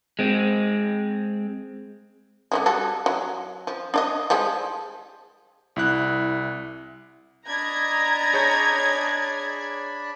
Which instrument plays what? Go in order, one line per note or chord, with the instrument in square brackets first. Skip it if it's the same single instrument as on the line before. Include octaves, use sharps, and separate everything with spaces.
[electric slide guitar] G#3 C4
[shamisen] D3 E3 G#3
G3 F#4 A4
F#3
F3
D4 D5 D#5
F3 G3 G#3
[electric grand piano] C2 E4 F#6
[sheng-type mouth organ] D4 D5 B5 [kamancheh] D#5 A#5 [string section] G#6
[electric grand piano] G#4 C#5 G6